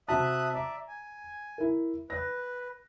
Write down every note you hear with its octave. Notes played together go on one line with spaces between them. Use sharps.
C3 F#4 E5 A5 D#6 F#6
D5 E5 A#5
G#5
E4 A#4
B4 F#6 A#6